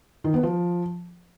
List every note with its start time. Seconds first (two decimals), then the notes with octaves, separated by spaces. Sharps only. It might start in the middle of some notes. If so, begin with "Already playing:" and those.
0.24 D#3
0.34 B3
0.43 F3